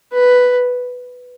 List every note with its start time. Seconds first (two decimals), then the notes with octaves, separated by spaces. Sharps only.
0.13 B4